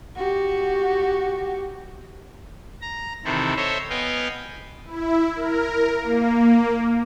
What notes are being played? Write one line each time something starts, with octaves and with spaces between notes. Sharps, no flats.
F#4 G4
A#5
C3 D#3 E3 C4 E4 A4
A4 C5 C#5 D#5 E5
B3 D#5 F5 G5 G#5
E4
A#4
A#3